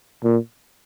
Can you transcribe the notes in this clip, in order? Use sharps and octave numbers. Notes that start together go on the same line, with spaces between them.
A#2